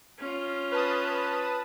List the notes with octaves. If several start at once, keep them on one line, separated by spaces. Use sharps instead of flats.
C#4 F4
B4 A5 D#6